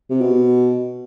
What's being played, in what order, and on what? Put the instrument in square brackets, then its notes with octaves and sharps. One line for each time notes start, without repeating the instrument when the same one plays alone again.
[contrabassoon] C3
B2